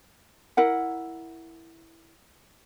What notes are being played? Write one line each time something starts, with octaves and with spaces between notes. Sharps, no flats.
E4 A#4 F#5